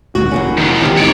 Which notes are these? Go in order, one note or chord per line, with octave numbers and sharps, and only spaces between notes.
D#1 G#1 D2 F#4
F1 E2 A#3 C#4
D#3 F#3
B1 C3 E3 F4 G4
C4 D#4 C#5 D5